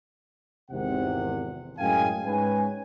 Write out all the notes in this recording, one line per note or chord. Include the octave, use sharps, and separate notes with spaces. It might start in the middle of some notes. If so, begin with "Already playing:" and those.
G#1 E2 C3 F#5
F#2 A2 G#3 F5 G5 G#5
G#2 G#3 C#4 B4 G#5